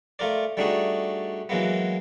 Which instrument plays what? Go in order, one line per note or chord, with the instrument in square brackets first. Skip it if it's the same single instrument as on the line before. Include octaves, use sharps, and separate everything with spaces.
[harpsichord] A3 F4 A#4 D5
G3 A3 D4 D#4 F#4 G#4
E3 F#3 G#3 A#3 B3